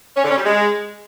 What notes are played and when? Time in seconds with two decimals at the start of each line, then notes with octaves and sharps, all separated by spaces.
0.17 C#4
0.24 D3
0.31 C#4
0.38 G3
0.44 G#3